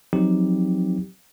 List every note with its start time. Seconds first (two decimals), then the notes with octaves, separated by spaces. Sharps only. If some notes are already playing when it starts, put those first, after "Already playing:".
0.13 F3 F#3 C4 D#4 G4